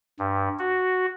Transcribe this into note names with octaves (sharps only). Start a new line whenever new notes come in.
G2
F#4